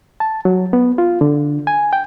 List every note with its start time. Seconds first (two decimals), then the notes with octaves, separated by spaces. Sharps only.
0.20 A5
0.45 F#3
0.73 B3
0.98 F4
1.21 D3
1.67 G#5
1.93 G5